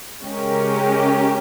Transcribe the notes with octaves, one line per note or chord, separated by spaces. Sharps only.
C#3 G#3 C#4 G4 A#4